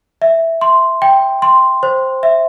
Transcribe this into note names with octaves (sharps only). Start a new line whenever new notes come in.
E5
C6
G5
C6
C5
E5